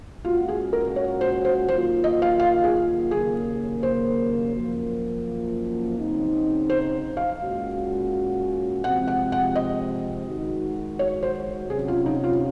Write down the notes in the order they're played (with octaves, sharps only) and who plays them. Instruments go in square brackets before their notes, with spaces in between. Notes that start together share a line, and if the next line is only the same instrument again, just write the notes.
[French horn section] A#2 G#3 C#4 F#4 [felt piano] F4
[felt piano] G#4
A#4
C#5
C5
C5
[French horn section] D#3 F#3 A#3 F4 [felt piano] C5
[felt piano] D#5
F5
F5
G#4
[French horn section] D#2 C#3 F#3 A#3 [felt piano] G#4
[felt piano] C5
[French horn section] F#2 F3 A#3
C#3 F#3 C4 D#4
[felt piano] C5
F5
[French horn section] A#2 G#3 C#4 F#4
[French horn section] C3 F3 G#3 C4 [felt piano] F#5
[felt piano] F#5
F#5
D#5
[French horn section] D#3 G#3 D#4 F#4
[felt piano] C#5
C5
[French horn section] C3 F#3 C#4 [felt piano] G#4
[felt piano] F4
D#4
F4